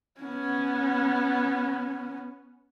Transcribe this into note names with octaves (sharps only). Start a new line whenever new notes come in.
B3 C#4